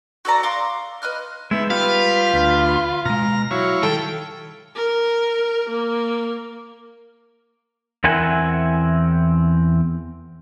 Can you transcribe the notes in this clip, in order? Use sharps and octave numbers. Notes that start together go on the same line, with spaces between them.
F#4 A4 D5 A#5
F5 C6 D6
B4 D#5 F6 F#6
G#3 B3 D#4 E5
G3 F4 B4 F5
D2
B2 G#3 A#5 F6
F#3 E4 F#4 C#5 F5
D#3 G3 A4 G5
A#4
A#3
E2 C4 E4 A#4 F#5 G#5